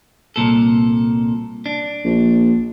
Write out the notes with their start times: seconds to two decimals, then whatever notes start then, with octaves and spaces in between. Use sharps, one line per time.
0.36 C2 A#2 A4
1.66 D4
2.04 A#1